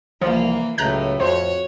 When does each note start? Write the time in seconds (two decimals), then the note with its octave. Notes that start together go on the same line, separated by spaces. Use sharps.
0.22 C2 E3 F3 A#3
0.78 C#2 A2 F#3 A3 A#5 F#6 G6
1.20 F2 F#4 C5 C#5